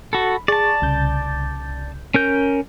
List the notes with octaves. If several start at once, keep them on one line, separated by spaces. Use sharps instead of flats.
F#4 A4 B5
G#4 D5 A5 C#6
C2 C#3 G6
C#4 A#4 G6